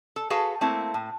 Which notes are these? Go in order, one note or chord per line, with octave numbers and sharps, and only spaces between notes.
A4
F#4 G#4 A4 B4 F5 A5
A3 A#3 C4 E4
A2